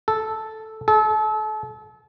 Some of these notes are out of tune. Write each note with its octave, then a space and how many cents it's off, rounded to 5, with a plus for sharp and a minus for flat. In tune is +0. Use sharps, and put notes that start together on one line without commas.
A4 -5
A4 -35